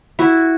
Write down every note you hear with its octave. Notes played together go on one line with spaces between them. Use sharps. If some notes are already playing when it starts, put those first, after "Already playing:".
E4 F#4